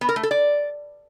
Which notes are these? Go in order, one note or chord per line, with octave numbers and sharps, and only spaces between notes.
B3
A#4
A3
A4
D5